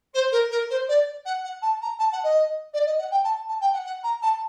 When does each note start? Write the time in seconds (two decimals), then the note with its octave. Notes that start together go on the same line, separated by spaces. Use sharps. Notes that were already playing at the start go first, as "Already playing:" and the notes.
0.14 C5
0.31 A#4
0.50 A#4
0.70 C5
0.88 D5
1.25 F#5
1.43 F#5
1.62 A5
1.81 A#5
1.99 A5
2.12 F#5
2.23 D#5
2.73 D5
2.86 D#5
2.98 F#5
3.11 G5
3.23 A5
3.48 A5
3.61 G5
3.73 F#5
3.85 F#5
4.03 A#5
4.22 A5